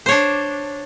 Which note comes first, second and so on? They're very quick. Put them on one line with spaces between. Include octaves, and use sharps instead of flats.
C5 C#5 D4